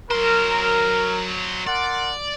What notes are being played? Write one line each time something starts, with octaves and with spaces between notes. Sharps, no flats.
F#3 A#4 C5
A#4 D5 F#5 C6